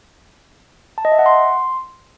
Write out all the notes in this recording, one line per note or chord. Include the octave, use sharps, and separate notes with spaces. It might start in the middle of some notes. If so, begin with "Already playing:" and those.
A5
D#5
E5
F#5
C6